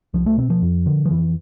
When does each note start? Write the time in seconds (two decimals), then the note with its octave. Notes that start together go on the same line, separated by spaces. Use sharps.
0.14 C2 F3
0.26 A3
0.38 B2 C4
0.50 F3
0.62 F2
0.86 D3
1.06 F3
1.10 F2 E3